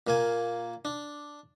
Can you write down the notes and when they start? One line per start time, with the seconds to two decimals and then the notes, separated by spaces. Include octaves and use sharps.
0.07 A#2 A#3 G#5
0.85 D4